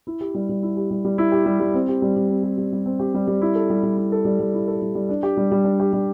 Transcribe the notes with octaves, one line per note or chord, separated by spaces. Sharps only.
E4
G4
G3
G3
E4
G4
G3
G3
E4
G4
G3
G3
C4
G4
G3
G3
C4
G4
G3
G3
C4
G4
G3
G3
E4
A4
G3
G3
E4
A4
G3
G3
E4
A4
G3
G3
D4
G4
G3
G3
D4
G4
G3